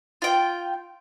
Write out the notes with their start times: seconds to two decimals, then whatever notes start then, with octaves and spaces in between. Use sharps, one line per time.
0.22 F4 G5